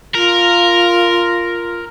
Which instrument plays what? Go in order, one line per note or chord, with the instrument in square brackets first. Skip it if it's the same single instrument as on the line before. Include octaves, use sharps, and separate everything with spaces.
[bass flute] F4 [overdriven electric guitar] A#4